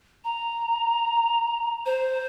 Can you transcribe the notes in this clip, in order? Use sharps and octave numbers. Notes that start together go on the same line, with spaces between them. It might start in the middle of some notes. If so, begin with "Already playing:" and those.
A#5
C5